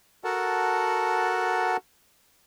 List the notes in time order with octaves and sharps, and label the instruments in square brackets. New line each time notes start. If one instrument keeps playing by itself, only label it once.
[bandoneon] F#4 A4 A#4 F#5 A5